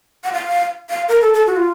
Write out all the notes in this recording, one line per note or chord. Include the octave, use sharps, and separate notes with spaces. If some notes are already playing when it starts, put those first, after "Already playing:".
F#5
F5
F5
A#4
A4
A4
F#4
F4